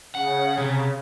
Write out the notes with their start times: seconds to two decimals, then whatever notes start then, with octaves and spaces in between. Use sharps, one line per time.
0.15 C#3 F#5
0.58 C3